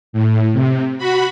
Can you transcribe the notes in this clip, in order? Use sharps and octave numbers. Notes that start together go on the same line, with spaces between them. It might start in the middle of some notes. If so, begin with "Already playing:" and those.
A2
C3
F#4 B5